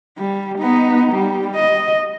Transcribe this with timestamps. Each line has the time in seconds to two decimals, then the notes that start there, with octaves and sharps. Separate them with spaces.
0.18 G3
0.59 B3 D#4
1.12 G3
1.56 D#5